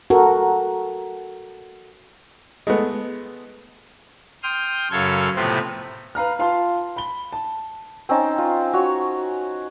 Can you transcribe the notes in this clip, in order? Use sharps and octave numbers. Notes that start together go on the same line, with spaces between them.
F#4 A4 A#4
G#3 A3 B3
G5 C6 D#6 F6
F#2 C#3 A4 C#5 F5 G#6
A2 C3 F3 B3 C4
B4 F5 A#5 F6
F4 F5 A5 C6
B5 G7
A5
C4 C#4 D#4 A5
F4
F#4 C#5